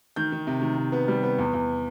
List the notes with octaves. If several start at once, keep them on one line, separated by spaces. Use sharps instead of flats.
D#3 G6
D#3
C3
D#3
C3
B3
G3
B3
E2
E2